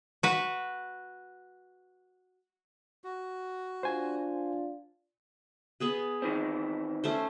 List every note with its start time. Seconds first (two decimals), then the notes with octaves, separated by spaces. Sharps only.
0.23 F#4 B4
3.04 F#4
3.83 D4 F4 C5 G#5
5.80 B3 G#4 B4
6.22 D#3 E3 C4
7.04 A3 C#4 C5